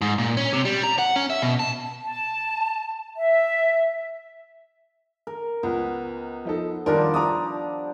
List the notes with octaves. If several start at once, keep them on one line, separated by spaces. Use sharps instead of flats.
G#2
A#2
C#4
C3
G3
A#5
F#5
C#4
E5
B2
A5
A5
E5
A#4
C#2 B3
F3 D#4 A4
D#3 F3 G3 D4 A#4
A#5 D6 D#6